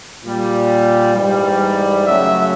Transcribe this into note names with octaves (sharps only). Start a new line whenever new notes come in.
A#2 G3
G#2 E3 G3
F#2 C#3 F#3 A3 E5